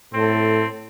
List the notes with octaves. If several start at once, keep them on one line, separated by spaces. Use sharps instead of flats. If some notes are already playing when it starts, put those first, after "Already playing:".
A2 C4 A4